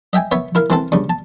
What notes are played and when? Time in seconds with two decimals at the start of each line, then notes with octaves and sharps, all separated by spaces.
0.13 D#5 E5 G5 G#5
0.31 B3 C#5 E5
0.55 E4 A#4 F5
0.70 E3 C4 A4
0.92 G2 C#3
1.10 A5